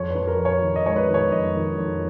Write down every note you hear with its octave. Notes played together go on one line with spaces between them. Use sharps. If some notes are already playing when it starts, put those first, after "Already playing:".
Already playing: F2 C#5
B4
F2
A#4
F2
C#5
D#3
D#5
G#3 C#5
B4
D#3
C#5
F2 D#5
D#3
F2